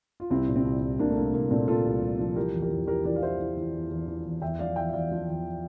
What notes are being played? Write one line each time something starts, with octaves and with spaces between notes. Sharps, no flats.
F4
C2 C4 E4
A#2
C4 E4
C2
C2
C2 A#3 D4
A3
C2 A#3
C2 A#3
A#2 A3 C4
A#2 F4 A4
C2
C2
F3
E3 G4 A#4
E2
G4 A#4
E2
E3 G4 A#4
E3 A#4 D5
F5
E3 C5 E5
E3
E3
E2
E2
E3
E2
E2 E5 G5
F3 D5 F5
E2 E5 G5
E5
E2 D5 F5
F3
E2